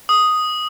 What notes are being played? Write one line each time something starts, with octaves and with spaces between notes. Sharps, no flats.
D#6